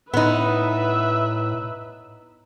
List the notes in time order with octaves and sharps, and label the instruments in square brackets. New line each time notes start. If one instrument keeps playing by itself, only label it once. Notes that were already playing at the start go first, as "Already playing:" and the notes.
[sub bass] A2 [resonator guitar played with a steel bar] B3 D#4 [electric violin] B4 E5